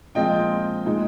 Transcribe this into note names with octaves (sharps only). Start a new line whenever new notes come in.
A#2 F3 G#3 C4 F4 D#5 G5
A#2 G#3 D#4